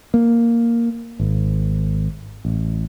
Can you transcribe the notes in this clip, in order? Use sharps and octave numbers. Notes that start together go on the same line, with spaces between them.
A#3
G#1
A1